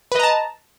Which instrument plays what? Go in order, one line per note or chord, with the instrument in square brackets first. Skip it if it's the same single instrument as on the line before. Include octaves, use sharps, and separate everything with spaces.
[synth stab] B4
D#5
A#5
A5